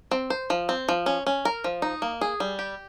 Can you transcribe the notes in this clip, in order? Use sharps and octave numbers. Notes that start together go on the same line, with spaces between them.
C4
C5
F3
C4
F3
C#4
C#4
A#4
F3
D#4
A#3
G#4
G3
G4